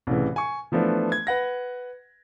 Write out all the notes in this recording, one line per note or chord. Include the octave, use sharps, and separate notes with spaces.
C2 A2 C#3 E3
G#5 C#6
E3 F3 A3 B3 D4
G#6
B4 F#5 A#6